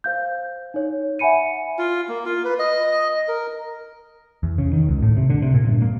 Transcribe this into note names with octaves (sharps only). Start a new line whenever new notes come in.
C5 F5 G6
D#4 C#5
E5 F#5 G#5 B5 C#7 D#7
F4
A#3
F4
B4
D#5
A#4
E2
C#3
D#3
C#2
A2
C3
D3
C3
A#2
G2
A#3